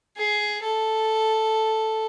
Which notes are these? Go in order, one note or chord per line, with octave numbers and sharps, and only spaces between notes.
G#4
A4